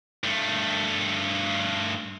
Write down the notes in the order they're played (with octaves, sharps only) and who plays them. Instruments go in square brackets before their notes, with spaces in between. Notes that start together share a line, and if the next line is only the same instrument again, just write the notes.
[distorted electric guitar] G2 A3